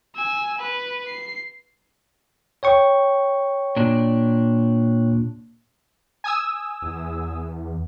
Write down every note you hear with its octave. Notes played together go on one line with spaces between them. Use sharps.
G#5 E6
B4
C7
C#5 G5 C#6
A#2 D4 D5
G#5 D#6 E6
E2